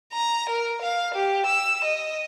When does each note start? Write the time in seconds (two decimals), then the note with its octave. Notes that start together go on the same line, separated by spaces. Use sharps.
0.13 A#5
0.49 A#4
0.82 F5
1.14 G4
1.46 E6
1.84 D#5